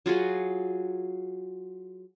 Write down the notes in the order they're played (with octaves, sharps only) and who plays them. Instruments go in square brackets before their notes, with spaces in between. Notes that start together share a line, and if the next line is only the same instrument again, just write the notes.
[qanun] F#3 F4 F#4 G#4